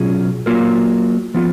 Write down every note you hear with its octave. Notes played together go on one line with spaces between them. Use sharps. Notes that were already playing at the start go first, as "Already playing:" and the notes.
Already playing: B2 F#3 C#4 F4 G#4
F#3 A#3 F4 A#4
F3 B3 F4